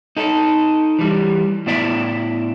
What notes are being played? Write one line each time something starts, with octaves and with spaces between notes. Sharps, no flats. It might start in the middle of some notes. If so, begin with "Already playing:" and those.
D#4 A4
E3 G3
A2 B3 E4 D5 E5 G5